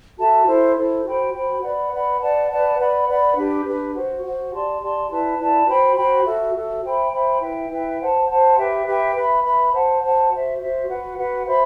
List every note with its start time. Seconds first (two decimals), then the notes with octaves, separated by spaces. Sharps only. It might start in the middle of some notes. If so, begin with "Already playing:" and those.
0.18 F#4 A4 E5 A5
0.47 E4 A4 C5
0.76 E4 A4 C5
1.04 F#4 C5 G5 B5
1.33 F#4 C5 G5 B5
1.62 B4 D5 F#5 B5
1.92 B4 D5 F#5 B5
2.21 B4 D5 F#5 A5
2.49 B4 D5 F#5 A5
2.79 B4 D5 F#5 B5
3.08 B4 D5 F#5 B5
3.36 D4 G4 B4
3.65 D4 G4 B4
3.94 F#4 C5 F#5
4.23 F#4 C5 F#5
4.52 G4 D5 A5 C6
4.82 G4 D5 A5 C6
5.10 E4 B4 D5 A5
5.39 E4 B4 D5 A5
5.67 F#4 C5 G5 B5
5.97 F#4 C5 G5 B5
6.26 F#4 A4 E5
6.55 F#4 A4 E5
6.84 C5 E5 G5 B5
7.12 C5 E5 G5 B5
7.41 E4 B4 E5 G5
7.70 E4 B4 E5 G5
7.99 C5 F#5 A5
8.28 C5 F#5 A5
8.58 G4 B4 E5 G5
8.86 G4 B4 E5 G5
9.15 B4 E5 B5
9.44 B4 E5 B5
9.72 C5 F#5 A5
10.02 C5 F#5 A5
10.30 F#4 C5 E5
10.59 F#4 C5 E5
10.88 F#4 B4 F#5
11.17 F#4 B4 F#5
11.46 C5 E5 B5